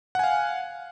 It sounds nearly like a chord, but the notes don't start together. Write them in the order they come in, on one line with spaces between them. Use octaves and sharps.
F#5 G#5 F5